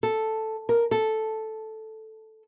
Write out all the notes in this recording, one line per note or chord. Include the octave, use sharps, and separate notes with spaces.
A4
A#4
A4